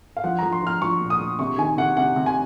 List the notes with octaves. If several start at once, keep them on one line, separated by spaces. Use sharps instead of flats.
F5
F3 F#5
F3 A#5
C6
F3 F6
F3 C#6
A#2
D#6
A#2
C3 C#6
D#3 G#5
C3 F#5
C3 F#5
C3
G#5